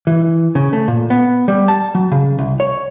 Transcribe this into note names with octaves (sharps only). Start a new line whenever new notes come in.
E3
C#3
A3
A#2
B3
G3
A5
F#3
C#3
C2
C#5